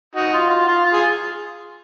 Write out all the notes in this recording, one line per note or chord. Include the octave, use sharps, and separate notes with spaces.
D#4 F#4
F4
F4
F4
F4
G#4